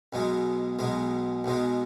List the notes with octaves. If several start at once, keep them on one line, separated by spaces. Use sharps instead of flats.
B1 B2 G#3
B1 B2 G#3
B1 B2 G#3